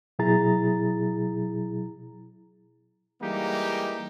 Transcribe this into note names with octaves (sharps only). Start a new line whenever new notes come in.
B2 F#3 E4 G#4 A#5 A6
E3 G3 G#3 A#3 D#4 G4